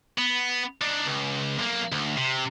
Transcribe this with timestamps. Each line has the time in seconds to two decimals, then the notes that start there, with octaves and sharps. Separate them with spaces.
0.18 B3
0.81 D4 D#4
1.06 C#2
1.59 B1 A#3
1.92 D2
2.17 C3